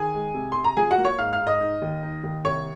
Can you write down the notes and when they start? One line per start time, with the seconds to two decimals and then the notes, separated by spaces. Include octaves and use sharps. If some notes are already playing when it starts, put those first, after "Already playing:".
Already playing: D#3 G#4 G#5
0.14 G#3
0.34 C3
0.52 C3 C6
0.64 A#5
0.77 F3 G#4 G#5
0.91 F#4 F#5
0.98 A#3
1.05 C#5 C#6
1.18 G#2 F5 F6
1.33 F5 F6
1.40 G#2
1.47 D#5 D#6
1.61 D#4
1.82 D#2
2.03 D#4
2.24 D#2
2.44 C2 C#5 C#6